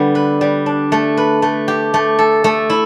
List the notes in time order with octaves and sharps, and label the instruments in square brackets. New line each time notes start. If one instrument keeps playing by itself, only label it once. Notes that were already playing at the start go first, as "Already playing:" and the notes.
Already playing: [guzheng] D3 G3 B3
B4
G3
D4
A3
B4
A3
G4
A3
A4
A3
E4